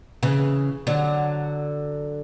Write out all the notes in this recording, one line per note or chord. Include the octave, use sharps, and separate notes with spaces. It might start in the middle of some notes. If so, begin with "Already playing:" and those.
C#3 E3
D3 F#3